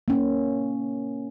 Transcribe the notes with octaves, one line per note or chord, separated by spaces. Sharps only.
A#3 C#4